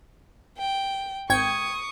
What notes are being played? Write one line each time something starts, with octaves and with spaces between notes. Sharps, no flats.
G5
G#1 G5 C#6 D#6 G#6